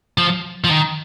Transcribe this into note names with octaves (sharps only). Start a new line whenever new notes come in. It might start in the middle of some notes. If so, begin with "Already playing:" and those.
F3
F3
D#3